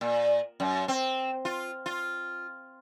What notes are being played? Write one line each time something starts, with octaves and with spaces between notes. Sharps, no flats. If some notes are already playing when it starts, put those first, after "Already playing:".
A#2
F#2
C4
F4
F4